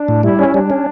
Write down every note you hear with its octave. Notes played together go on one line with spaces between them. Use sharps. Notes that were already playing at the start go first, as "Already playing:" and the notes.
Already playing: D4
A2
G3 E4
C#4
G3 D4
C#4